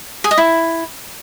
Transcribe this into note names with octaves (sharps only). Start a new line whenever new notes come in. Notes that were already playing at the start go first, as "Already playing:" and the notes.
G#4
D#5
E4